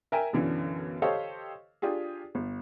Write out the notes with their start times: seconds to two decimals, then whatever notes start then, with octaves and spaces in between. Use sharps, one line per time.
0.12 A#4 E5 G5 G#5 A#5
0.33 B1 F#2 D3 E3
1.02 G4 A4 C5 C#5 D#5 F5
1.82 D4 F4 G4 G#4
2.35 G1